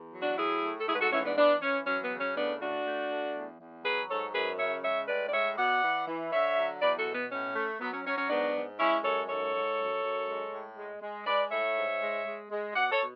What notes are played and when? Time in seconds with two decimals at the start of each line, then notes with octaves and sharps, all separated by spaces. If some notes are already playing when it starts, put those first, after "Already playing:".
Already playing: E2
0.14 F#3
0.22 D4 F#4
0.38 A2 E4 G#4
0.64 A3
0.80 A4
0.88 G#2 E4 G#4
0.95 B4
1.01 F#4 A4
1.13 E3 C#4 E4
1.25 B3 D4
1.38 E3 B3 D4
1.62 E3 C#4
1.87 F#3 C#4
2.03 B3
2.11 C#3
2.20 C#4
2.36 A2 B3 D4
2.61 A3 D4 F#4
2.86 A3
3.11 A3
3.35 E2
3.60 E2
3.85 F#3 G#4 B4
4.09 G#2 A4 C#5
4.34 F#2 G#4 B4
4.59 C#3 C#5 E5
4.83 G#3 C#5 E5
5.08 A2 B4 D5
5.28 D5
5.33 G#3 C#5 E5
5.58 B2 D5 F#5
5.83 E3
6.07 E3
6.33 D3 C#5 E5
6.58 F#3
6.82 E2 B4 D5
6.98 F#4 A4
7.07 B2
7.15 B3
7.31 A2 C#4
7.55 A3
7.81 F#3 B3
7.93 C#4
8.06 F#3 C#4
8.18 C#4
8.30 G#2 B3 D4
8.55 G#2
8.80 G#3 C#4 E4
9.04 F#2 A4 C#5
9.29 G#2 A4 C#5
9.54 G#2
9.79 F#2
10.03 F#2
10.28 G#3
10.53 A2
10.77 G#3
11.02 G#3
11.26 G#3 B4 D5
11.51 A2 C#5 E5
11.76 G#2
12.01 G#3
12.26 G#3
12.51 G#3
12.75 B2 D5 F#5
12.91 A4 C#5
13.00 B2